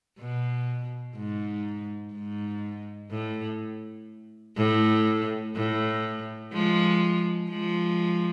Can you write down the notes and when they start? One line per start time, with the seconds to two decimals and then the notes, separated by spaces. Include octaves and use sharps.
0.19 B2
1.16 G#2
2.13 G#2
3.11 A2
4.57 A2
5.55 A2
6.52 F3 G#3
7.50 F3 G#3